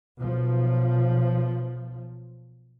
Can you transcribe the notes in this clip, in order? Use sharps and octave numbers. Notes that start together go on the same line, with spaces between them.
B1 F3